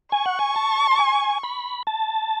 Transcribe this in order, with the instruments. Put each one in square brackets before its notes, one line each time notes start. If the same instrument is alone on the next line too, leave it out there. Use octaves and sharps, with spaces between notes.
[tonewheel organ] G#5 [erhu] C#6
[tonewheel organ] F#5
G#5
A5
A5
G#5
B5
A5